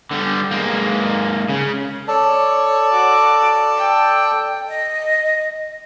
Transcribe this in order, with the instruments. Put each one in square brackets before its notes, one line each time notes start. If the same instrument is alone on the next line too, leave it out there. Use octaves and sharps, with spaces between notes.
[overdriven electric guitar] D3 G3
G#3 A#3
C#3
[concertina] A4 D5 A5 [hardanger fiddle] C#5
[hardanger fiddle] F#4 D6
G5
[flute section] D#5